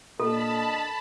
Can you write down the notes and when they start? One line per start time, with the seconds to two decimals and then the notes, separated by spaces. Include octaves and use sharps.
0.20 A#2 D4 A4 A#4 D#5 A5 B5